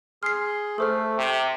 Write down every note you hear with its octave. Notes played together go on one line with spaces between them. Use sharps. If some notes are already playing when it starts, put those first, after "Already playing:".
G#4 C6 F6 C7
A3 A4 C5 F6
C3 G4